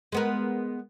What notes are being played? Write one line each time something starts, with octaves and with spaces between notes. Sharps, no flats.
G#3 B3 A#4